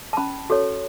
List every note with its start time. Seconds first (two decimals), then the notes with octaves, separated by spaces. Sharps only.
0.13 A5
0.17 C#4 B5
0.50 F#4 A4 C#5